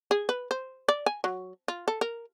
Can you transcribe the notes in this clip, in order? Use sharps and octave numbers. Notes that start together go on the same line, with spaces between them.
G#4
B4
C5
D5
G#5
F#3
F4
A4
A#4